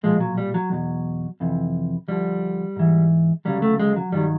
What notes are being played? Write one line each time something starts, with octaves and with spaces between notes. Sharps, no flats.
B1 A#2 F3 G#3
F#3
G3
F#3
E2 B2 F#3
F2 C3 E3
D2 D3 F3 G3
G#2 E3
D2 C#3 F#3 G3
A3
G#3
F#3
G2 D#3 F#3 G3